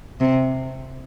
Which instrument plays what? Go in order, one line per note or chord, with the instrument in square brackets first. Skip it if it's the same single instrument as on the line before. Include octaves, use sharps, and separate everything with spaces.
[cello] C3